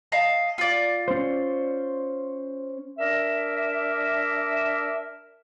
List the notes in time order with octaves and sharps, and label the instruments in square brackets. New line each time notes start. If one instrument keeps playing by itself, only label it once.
[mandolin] D#5 F5 A5
F4 D5
[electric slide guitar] C#4 C5
[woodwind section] D4 A#4 E5